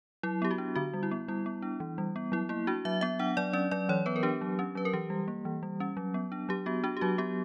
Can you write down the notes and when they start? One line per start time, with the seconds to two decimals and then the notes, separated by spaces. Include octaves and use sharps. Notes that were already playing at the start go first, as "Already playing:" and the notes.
0.23 F#3 E4
0.42 B3 G4
0.51 F#4
0.58 D4
0.76 D3 F#4
0.93 G3
1.03 E4
1.11 B3
1.28 G3 E4
1.46 B3
1.62 D4
1.80 E3
1.98 G3
2.16 B3
2.32 F#3 E4
2.49 A#3 E4
2.67 D4 F#4
2.85 F#3 E5
3.01 B3 E5
3.19 D4 F#5
3.37 F#3 D5
3.53 C#4 D5
3.71 F#3 D5
3.89 E3 C#5
4.06 B3 B4
4.16 A#4
4.23 D4 G4
4.41 F#3
4.59 C#4
4.75 F#3 B4
4.85 A#4
4.93 E3 G4
5.10 G3
5.28 A#3
5.45 E3
5.63 G3
5.80 C#4
5.97 F#3
6.14 B3
6.32 D4
6.49 F#3 G4
6.66 B3 F#4
6.84 D4 F#4
6.97 G4
7.01 F#3 F#4
7.18 B3 G4